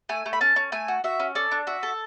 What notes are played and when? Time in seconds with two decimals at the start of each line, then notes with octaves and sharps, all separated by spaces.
0.09 A3 G#5
0.26 A3
0.33 B5
0.41 C#4 A5
0.56 C#4
0.72 A3 G#5
0.88 F#4
1.04 F#4 E5
1.20 C#4
1.35 A4 D5
1.51 D4
1.67 F#4 E5
1.83 A4